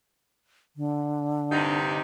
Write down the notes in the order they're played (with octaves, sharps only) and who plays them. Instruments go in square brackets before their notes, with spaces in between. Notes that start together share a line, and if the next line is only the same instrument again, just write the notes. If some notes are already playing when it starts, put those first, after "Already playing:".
[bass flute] D3
[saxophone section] G2 C3 D#4